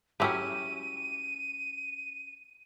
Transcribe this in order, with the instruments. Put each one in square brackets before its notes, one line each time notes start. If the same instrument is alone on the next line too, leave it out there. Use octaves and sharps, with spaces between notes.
[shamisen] F#3 G#3 A3 [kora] C#4 E4 G4 [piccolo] D#7